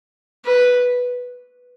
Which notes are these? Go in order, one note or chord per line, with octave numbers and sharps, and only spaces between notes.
B4